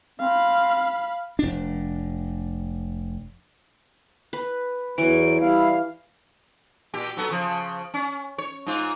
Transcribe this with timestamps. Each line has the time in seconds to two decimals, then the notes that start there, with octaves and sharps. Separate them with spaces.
0.20 C4 F5 B5
1.39 F1 D4
4.33 B4
4.98 E2 E3 F#3 D7
5.40 G3 E4 F5
6.94 A#2 G4
7.17 F#3 B3 A4
7.29 C#3 F3
7.94 C#4
8.38 C#5
8.67 G#2 F4